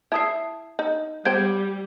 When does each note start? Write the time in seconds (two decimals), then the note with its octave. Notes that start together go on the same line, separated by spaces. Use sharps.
0.12 E4 E5 A5 D#6 C7
0.79 D#4
1.25 G3 B3 C5 G5 G6 G#6 D7